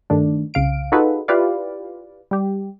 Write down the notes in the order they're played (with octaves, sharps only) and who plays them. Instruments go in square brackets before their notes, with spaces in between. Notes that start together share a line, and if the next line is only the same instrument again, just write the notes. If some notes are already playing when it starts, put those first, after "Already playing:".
[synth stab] G2 D#3 A3 D4
C2 C#3 F5 D7
D#4 F4 F#4 G#4 A4 B4
E4 F4 G4 B4 D5 F5
G3 G4